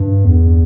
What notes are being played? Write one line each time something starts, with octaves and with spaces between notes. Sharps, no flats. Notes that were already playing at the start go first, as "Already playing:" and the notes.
Already playing: G2
E2